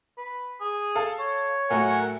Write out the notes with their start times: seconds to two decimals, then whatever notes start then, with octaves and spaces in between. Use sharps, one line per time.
0.18 B4
0.61 G#4
0.95 A4 F5 A5
1.20 C#5
1.70 A2 F#3 A3 A#4 F#5 G#5